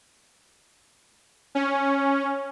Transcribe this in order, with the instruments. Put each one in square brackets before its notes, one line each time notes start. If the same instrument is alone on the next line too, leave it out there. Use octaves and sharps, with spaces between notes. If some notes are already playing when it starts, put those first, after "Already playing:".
[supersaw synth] C#4